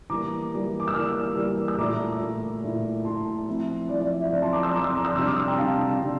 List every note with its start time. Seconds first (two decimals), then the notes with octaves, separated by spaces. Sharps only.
0.10 E3 G3 A#3 A#5 D6
0.52 E3 G3 A#3
0.80 D6
0.88 E6
0.94 E3 G3 A#3 D6 F6
1.36 E3 G3 A#3
1.68 E6
1.78 A#2 A3 E4 A#5 D6
2.20 A#2 A3 E4
2.63 A#2 A3 E4
3.04 A#2 A3 E4 A5 C6
3.47 F3 C4 E4
3.89 F3 C4 E4 D5
4.00 D5
4.10 E5
4.21 E5
4.31 F3 C4 E4 D5
4.42 A5 C6
4.53 A#5 D6
4.63 C6 E6
4.74 F3 C4 E4 A#5 D6
4.84 C6 E6
4.94 A#5 D6
5.05 C6 E6
5.16 C3 G3 D4 C6 E6
5.26 D6 F6
5.37 C6 E6
5.47 G5 A#5
5.58 C3 G3 D4 F5 A5
6.00 C3 G3 D4